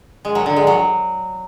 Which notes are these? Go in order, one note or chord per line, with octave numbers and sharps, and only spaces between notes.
G#3
F#3
D3
G#3
F#3